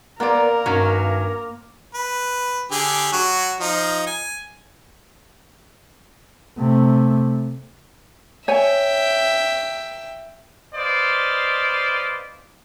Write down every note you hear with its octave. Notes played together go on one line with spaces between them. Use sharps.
A#3 B3 A#4 D5 C6
G2 D#3 F#3 C#4
B4
D3 G4 G#4
F#3 F#4
F3 D#4
G#5
C3 A3
C#5 E5 G5 G#5
B4 C5 D5 D#5 F5 C6